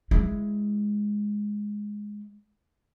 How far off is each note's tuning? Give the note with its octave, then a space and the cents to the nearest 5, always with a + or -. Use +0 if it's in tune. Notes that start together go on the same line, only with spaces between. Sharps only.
G#3 +0 E4 +0